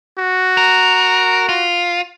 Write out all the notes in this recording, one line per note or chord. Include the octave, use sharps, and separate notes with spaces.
F#4
A#4
F4